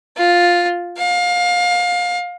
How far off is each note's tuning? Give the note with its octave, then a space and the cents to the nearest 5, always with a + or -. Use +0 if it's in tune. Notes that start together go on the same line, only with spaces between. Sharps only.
F4 +5
F5 +25